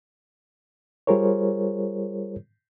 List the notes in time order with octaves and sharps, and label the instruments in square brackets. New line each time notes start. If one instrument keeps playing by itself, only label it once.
[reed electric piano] G3 F4 G#4 A#4 C5 C#5